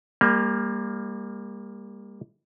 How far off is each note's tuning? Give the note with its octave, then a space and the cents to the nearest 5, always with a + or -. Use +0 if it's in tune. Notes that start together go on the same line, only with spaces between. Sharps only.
G3 +35 A#3 +0